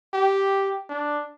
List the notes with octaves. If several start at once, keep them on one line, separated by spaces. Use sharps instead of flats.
G4
D4